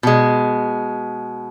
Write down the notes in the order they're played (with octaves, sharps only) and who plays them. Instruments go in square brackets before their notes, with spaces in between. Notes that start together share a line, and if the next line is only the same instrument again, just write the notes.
[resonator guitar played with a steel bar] B2 G#3